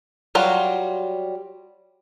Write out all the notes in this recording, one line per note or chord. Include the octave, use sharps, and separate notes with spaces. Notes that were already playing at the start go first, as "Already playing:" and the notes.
F#3 G3 F4 F#4